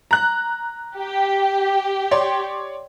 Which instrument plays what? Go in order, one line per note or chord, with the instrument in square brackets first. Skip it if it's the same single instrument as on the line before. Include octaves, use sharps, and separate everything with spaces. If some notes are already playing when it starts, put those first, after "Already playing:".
[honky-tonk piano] A#5 F#6
[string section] G4
[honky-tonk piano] C#5 D5 C6